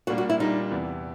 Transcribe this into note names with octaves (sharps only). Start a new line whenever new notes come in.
A#2 G3 A#3 D4 F#4
F#4
E4
A#2 G3 A#3 D4 D#4
E2 C3 E3